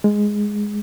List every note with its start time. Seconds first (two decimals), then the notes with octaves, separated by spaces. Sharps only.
0.04 G#3